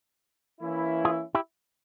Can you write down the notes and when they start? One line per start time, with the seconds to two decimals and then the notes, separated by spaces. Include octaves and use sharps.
0.60 E3 A#3 C#4 E4
1.05 F4 G#4
1.35 E4 G4